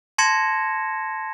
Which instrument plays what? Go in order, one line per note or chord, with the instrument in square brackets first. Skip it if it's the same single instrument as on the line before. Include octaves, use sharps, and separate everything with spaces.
[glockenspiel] A5 C6 G#6 A#6 C#7 E7